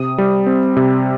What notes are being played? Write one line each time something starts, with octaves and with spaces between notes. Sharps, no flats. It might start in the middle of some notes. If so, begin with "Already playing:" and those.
Already playing: C3 D#6
G3
C4
C3